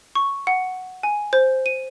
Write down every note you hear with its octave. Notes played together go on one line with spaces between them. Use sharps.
C#6
F#5
G#5
C5
D#7